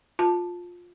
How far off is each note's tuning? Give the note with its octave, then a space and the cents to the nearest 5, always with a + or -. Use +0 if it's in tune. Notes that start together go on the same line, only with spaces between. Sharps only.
F4 +15 A5 +0